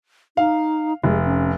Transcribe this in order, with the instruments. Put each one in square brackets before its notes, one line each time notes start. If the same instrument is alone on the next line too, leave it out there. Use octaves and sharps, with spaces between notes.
[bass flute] D#4 [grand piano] F5
[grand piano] F1 [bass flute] G#3
[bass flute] C#4